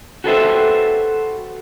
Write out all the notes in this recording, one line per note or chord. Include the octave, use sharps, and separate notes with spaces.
F#4 G4 A4 B4 C5 E5